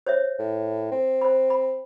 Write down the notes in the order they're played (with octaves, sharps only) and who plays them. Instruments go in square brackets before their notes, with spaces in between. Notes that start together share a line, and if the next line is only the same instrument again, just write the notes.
[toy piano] C5 C#5 E5
[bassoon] A2
C4
[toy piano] C5 B5
B5